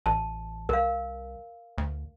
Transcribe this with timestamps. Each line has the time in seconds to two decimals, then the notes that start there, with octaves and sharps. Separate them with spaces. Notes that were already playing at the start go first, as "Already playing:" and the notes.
0.06 A1 A5
0.69 C2 A#4 F5
1.78 D2